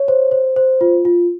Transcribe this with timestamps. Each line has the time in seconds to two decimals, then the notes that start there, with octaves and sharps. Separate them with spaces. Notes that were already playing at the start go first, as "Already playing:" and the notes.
Already playing: C#5
0.08 C5
0.31 C5
0.56 C5
0.81 F4
1.05 F4